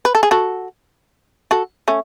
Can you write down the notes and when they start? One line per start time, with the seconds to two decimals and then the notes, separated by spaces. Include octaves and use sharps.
0.05 B4
0.15 A4
0.23 G#4
0.31 F#4 A4
1.51 F#4 A4
1.88 A3 C#4